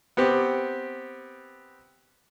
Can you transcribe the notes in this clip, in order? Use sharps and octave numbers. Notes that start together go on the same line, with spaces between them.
B3 C4 G4